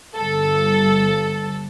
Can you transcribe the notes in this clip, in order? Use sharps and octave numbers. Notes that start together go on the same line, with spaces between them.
G1 A4